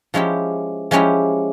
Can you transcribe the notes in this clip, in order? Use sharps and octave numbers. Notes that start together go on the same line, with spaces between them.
F3 G#3 C#4 E4 G4
F3 G#3 C#4 E4 G4